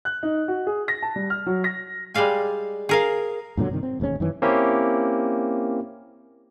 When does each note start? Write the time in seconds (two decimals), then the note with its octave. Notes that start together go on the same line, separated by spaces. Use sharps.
0.05 F#6
0.23 D#4
0.48 F#4
0.67 G#4
0.88 A#6
1.02 A5
1.16 G3
1.30 F6
1.46 F#3
1.64 A#6
2.14 G3 G#3 D5 F5 G#5
2.89 G#4 A#4 F5
3.57 G2 A#2 D3 F#3
3.69 G2 C3 D#3
3.83 C4
4.00 E1 D#2 G#2 C#4
4.20 F#2 D#3 E3 C#4
4.42 A#3 C4 C#4 E4 G4